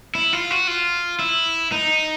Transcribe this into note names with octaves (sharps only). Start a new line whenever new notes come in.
E4
F4
F#4
F4
E4
D#4